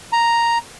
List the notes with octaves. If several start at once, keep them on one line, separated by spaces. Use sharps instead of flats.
A#5